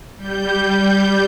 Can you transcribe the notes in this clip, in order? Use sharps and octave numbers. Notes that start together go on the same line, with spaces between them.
G3 G6